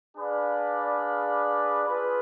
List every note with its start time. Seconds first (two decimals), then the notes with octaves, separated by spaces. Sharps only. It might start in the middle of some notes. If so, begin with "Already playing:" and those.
0.16 D4 G#4 B4 D5 F5
1.88 F4 G#4 B4